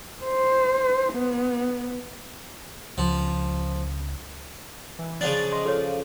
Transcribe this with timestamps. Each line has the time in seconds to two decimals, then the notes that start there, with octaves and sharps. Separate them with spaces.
0.23 C5
1.13 B3
2.98 C#2 F3
4.99 E3
5.21 C#3 F3 D4 A6
5.52 D#5 C6
5.65 F4 A4 C#5